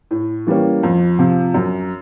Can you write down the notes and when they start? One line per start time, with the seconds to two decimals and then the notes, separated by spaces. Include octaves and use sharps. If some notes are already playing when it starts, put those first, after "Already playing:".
0.11 A2
0.47 E3 G3 A#3 C#4
0.83 F2
1.19 C3 F3
1.54 F#2